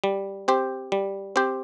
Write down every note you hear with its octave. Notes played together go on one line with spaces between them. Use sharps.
G3
C4 G4 C5
G3
C4 G4 C5